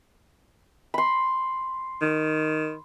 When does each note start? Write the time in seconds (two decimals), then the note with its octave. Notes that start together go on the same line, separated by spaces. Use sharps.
0.94 B5 C6
2.02 D#3